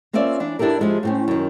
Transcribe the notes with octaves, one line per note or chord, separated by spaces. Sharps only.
A#3 C4 C#4 F4 D5 E5
E3 D4 E4
D4 E4 G4 A4 A#4
F3 G#3 E4
A2 C4 C#4
F#2 D#3